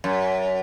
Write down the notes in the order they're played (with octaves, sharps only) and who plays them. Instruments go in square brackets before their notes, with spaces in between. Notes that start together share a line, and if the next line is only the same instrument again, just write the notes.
[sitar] F#2